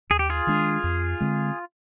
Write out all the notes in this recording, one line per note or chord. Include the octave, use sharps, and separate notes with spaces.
D#2 G#4
G4
F4 G#4
D#3 G#3 D4
F2
D3 G#3 C4